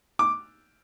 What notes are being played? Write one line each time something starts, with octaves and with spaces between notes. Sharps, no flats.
D6